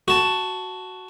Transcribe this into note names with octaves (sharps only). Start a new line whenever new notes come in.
F#4 A5